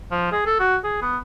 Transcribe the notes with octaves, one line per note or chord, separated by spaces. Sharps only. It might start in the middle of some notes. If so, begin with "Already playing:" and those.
F3
G#4
A4
F#4
G#4
B3